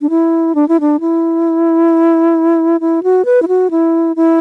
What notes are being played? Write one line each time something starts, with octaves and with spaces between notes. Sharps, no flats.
D4
E4
D4
E4
D4
E4
E4
F#4
B4
E4
F#4
E4
E4